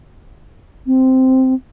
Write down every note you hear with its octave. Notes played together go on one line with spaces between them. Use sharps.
C4